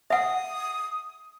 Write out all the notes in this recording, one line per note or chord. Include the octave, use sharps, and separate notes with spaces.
E5 F#5 D#6